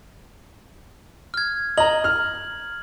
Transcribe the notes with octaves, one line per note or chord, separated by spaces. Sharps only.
F6 G#6
D#5 A#5 F#7
F6